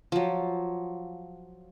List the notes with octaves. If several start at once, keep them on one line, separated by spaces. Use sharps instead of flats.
F3 F#3